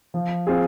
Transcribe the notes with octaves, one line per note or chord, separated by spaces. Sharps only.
F3
C4 F4 G#4